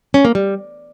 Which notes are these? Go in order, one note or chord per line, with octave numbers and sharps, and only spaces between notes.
C#4
A#3
G3